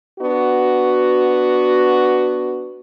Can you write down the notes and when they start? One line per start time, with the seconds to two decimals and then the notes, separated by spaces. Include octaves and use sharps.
0.20 B3 D4 F#4